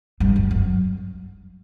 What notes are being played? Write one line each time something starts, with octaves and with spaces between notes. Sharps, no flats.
G2
G2
F#2